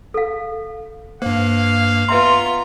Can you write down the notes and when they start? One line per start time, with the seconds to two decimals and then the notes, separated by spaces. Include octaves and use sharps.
0.14 A4 F5
1.22 G2 A#3 C5 F5
2.08 B3 F4 B4 E5 A#5 C6